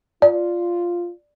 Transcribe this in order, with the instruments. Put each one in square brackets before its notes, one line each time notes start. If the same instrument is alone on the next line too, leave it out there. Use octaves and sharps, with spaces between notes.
[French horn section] F4 [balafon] D5